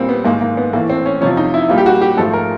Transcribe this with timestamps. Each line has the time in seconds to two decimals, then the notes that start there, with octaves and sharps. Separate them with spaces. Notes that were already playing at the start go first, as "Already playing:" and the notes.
Already playing: A#2 G3 A#3 C4
0.09 B3
0.25 G#2 D#3 G#3 A#3
0.41 A#3
0.57 B3
0.73 A2 E3 A3 A#3
0.90 C4
1.06 C#4
1.21 F2 C3 F3 C#4
1.37 D#4
1.54 E4
1.69 A#2 G3 A#3 F4
1.78 G4
1.86 F#4
2.02 G4
2.17 G#2 F3 A3 A4
2.33 A#4